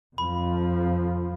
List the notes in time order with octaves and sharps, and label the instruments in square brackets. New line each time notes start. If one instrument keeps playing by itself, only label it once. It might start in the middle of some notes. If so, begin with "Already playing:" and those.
[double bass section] F2 F3 [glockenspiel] B5